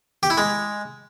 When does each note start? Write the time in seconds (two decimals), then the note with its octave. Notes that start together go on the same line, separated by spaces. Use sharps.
0.23 G4
0.30 E4
0.38 G#3